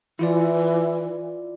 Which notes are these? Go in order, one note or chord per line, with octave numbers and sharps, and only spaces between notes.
E3 E4 F4 D5